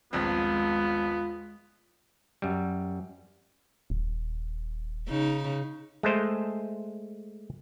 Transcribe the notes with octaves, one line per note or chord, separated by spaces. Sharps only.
D#1 A#1 G#3 B3 C4 F4
F#2 G3
D#1
C#3 D#4
G#3 A3 C5